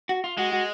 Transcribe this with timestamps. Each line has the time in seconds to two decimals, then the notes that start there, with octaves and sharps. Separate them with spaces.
0.09 F#4
0.24 F4
0.37 G#3 F#4
0.52 F#4